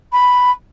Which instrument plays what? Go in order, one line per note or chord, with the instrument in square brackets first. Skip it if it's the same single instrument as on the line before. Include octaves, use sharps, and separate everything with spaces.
[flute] B5